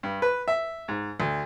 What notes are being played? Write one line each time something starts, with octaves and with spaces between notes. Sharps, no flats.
G2
B4
E5
G#2
D2